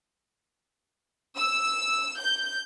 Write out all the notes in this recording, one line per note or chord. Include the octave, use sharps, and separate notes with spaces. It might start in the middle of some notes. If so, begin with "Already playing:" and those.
E6
G6